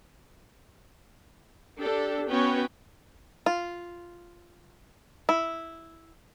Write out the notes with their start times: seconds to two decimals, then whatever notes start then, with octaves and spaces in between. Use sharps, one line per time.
1.81 D4 G4 A4
2.29 B3 C#4 F#4 B4 C#5 G5
3.46 F4
5.29 E4